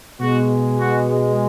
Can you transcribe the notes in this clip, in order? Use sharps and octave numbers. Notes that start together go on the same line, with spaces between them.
B2 G#3 F#4
F#4